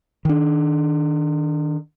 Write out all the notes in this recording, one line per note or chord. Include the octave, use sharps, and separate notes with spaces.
D#3 D4